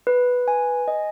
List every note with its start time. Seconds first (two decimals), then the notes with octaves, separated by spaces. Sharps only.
0.07 B4
0.48 G#5
0.88 D#5